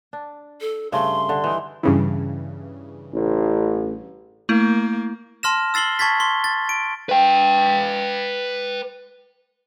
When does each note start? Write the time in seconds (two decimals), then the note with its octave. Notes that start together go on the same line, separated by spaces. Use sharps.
0.13 D4
0.61 A4
0.92 G2 C#3 A3 C6
1.29 D3
1.44 E3 D#4
1.83 G2 C#3 E3
3.14 A1
4.49 A3 A#3 E4
5.43 A5 C6 F6 A#6 E7
5.74 E6 A6 C7 F#7 G7
5.99 A5 C#6 G#6 A6 B6
6.20 C6 G7
6.44 A6
6.69 D7
7.09 B4 G5